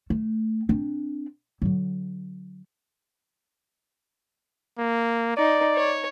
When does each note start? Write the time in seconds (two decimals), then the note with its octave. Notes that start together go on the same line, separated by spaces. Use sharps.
0.10 A3
0.69 C4 D4
1.62 D3 F#3
4.78 A#3
5.37 D#4 D5
5.75 C#5